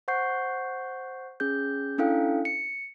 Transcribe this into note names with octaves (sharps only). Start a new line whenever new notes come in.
C5 F#5 C#6 G6 C7
C#4 G#4 G6
C#4 D4 E4 A4 F5 G5
C#7